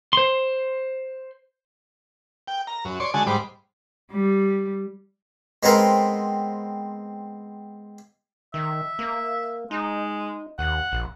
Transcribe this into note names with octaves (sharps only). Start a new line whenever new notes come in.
C5 C6
G5
A#5
F#2
C#5 D5 C6
D3 G#3 F#4 G#5 A5
G#2 G3 C5 B5 D6
G3
G#3 B3 C4 A#4
D#3 E5
A#3
G#3 D#4
D#2 F#5
A#1